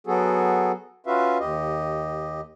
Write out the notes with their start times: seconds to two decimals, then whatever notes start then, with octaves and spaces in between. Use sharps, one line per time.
0.07 F#3 B3 F#4 G#4 A4
1.06 C#4 F4 F#4 B4 E5 F5
1.40 D#2 G4 D#5